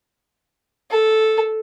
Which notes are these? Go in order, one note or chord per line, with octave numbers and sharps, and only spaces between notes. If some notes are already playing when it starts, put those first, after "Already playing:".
A4